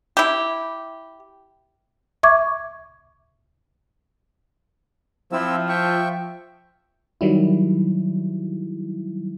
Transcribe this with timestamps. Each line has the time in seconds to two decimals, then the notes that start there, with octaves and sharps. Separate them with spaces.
0.17 E4 G4
2.23 E5 C#6 D6 G#6
5.33 F3 C4 E4 E6
5.69 E5 G5 C#6
7.21 D#3 F#3 G3 E4